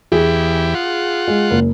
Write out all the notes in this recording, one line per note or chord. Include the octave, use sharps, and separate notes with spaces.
E2 E4 G4 G#4
F4 F#5
G#3
F#1